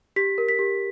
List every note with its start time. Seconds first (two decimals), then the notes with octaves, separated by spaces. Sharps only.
0.16 G4 B6
0.38 A#4
0.49 B6
0.59 G4